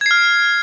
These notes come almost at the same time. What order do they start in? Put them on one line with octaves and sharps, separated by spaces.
G#6 C7 F6